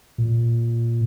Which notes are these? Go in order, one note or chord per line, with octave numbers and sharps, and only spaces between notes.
A#2